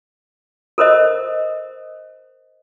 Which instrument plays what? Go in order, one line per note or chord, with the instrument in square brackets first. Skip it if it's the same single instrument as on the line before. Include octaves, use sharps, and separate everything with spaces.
[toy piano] A4 A#4 C5 D#5